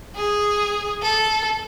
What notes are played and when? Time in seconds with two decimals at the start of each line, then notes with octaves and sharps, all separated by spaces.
0.16 G#4
1.02 A4